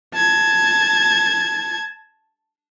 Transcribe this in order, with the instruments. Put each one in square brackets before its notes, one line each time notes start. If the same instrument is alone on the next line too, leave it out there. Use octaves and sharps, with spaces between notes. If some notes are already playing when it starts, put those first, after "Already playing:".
[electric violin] A5 G#6